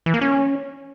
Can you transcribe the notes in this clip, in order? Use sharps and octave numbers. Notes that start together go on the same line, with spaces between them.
E3
A#3
C#4